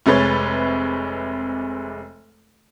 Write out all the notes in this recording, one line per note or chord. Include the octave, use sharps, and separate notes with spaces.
F1 C3 G#3 B4 C#5 A6